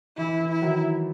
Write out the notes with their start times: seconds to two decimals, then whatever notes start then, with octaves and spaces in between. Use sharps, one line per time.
0.17 E3 E4
0.40 E3
0.51 E4
0.62 D#3 F#3